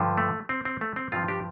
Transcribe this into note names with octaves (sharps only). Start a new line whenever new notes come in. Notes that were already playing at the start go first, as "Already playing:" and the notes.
Already playing: G2 D3 F3
A3
C4
C4
A3
C4
G2 F3 C4 F4
D4 G4